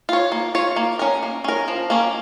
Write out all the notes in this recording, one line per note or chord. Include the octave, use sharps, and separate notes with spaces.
F4 C#5
A#3
F4 C#5
A#3
C#4 A#4
A#3
C#4 A#4
F3
A#3 C#4